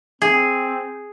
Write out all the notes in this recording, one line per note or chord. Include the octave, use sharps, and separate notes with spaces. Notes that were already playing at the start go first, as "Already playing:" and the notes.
C4 G#4